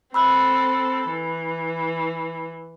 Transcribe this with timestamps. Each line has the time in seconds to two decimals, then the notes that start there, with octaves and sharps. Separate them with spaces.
0.14 C4 A4 B5 E6 F#6
1.09 E3